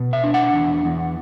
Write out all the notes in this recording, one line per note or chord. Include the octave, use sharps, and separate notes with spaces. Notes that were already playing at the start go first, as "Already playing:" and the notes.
Already playing: B2
E5
D4
F#5
E2
E2